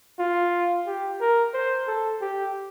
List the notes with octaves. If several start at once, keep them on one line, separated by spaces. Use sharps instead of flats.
F4
G4
A#4
C5
A4
G4